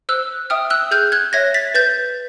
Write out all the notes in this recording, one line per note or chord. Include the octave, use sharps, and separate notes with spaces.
C5 E6 F#6
E5 G5 D#6 F6
E6 F#6
G#4 F6 G6
F#6 G#6
C#5 E5 G#6 A#6
A6 B6
B4 G6 A6